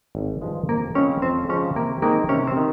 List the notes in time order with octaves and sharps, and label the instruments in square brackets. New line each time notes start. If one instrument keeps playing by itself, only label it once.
[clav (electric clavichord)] G#1
G2 F3 G#3
[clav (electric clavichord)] F2 [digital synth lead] A#3
[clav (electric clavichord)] C#3 F3 G#3 C4 [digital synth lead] C#4
[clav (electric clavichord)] F2 [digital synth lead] C4
[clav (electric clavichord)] C#3 F3 G#3 C4 [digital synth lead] C#4
[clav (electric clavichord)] C3 [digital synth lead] A#3
[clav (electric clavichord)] D#3 G#3 C4 D#4 [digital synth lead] A#3
[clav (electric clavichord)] C3 [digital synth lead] C#4
[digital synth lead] C4
[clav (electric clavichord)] D#3